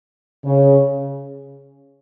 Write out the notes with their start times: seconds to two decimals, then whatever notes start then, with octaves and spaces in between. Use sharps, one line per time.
0.45 C#3